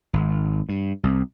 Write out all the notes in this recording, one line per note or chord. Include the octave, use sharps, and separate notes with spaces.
G#1
G2
C2